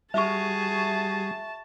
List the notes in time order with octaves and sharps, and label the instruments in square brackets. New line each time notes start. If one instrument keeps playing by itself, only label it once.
[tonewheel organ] G3 [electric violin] F#4 G#4 [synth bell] E5 C#6 [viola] A5